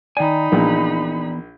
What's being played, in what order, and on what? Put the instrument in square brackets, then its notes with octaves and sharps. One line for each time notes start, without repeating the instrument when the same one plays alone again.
[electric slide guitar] D#3 G#5 [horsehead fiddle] D#4 B5 [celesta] D5 G5 A#5
[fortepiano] A#1 [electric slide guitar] E3 B3